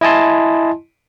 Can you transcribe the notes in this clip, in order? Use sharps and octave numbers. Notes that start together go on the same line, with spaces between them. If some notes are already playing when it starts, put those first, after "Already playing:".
E4 D#5 G#5 A5 C6